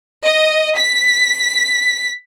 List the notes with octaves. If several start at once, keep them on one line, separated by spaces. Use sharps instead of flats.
D#5
B6